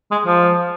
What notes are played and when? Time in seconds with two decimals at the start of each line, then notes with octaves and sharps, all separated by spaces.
0.11 G#3
0.26 F3